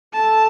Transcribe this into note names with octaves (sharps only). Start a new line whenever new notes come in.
A4 A5